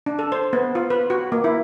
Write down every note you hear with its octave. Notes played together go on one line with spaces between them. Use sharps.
D4
A4
C5
B3
F4
B4
F#4
A#3
E4